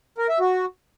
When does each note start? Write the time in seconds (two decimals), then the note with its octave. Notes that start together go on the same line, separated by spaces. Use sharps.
0.18 A#4
0.29 E5
0.40 F#4